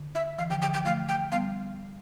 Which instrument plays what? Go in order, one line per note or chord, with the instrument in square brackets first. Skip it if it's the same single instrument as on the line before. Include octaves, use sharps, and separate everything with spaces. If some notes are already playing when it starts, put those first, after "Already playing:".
Already playing: [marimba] D3
[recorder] E5
[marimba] E3 [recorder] F5
[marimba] D3 F3 [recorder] G5
[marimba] D3 F3 [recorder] G5
[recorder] G5
[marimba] F3 A3 [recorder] F5
[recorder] G5
[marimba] G3 B3 [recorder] F5